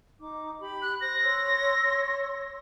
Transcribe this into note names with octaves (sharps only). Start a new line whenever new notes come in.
D#4 D6
G4 B5
F#6
C5 A#6
C#5 C6 E6